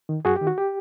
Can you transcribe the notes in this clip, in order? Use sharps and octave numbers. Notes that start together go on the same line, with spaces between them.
D#3
F#2 F#4 G#4
G4
D#3
F#4
G4